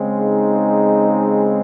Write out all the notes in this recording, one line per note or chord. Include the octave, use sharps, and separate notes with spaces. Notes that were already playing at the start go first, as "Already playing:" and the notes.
Already playing: C#3 G#3 C4
D#4